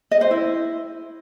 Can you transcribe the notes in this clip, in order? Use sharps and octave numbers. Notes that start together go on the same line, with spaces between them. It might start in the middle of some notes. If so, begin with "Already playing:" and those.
D#5
C5
E4